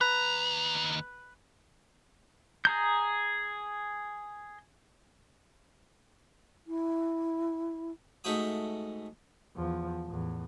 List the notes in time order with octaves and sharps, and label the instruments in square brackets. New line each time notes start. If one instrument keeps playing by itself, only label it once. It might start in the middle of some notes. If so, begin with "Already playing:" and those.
[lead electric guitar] D#2 A#5 [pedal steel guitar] B4
[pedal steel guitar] G#4 A#5 G6
[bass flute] E4
[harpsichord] G#2 A3 F#4 G5 D#6
[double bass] E2 F3
E2 A2